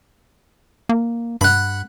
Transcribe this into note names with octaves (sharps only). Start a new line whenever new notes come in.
A#3
G2 F#5 B5